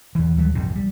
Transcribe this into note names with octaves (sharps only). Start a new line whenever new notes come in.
E2 E3
D#2 F#3 G3
A#1 F2 G#2 C3
G3